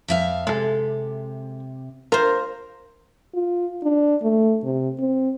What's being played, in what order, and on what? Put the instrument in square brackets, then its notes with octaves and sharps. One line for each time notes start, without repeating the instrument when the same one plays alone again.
[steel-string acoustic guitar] F2 E5 F5
[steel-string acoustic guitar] C3 [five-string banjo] G#3 A4
[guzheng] F4 C5 [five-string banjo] A#4
[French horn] F4
D4
A3
C3
C4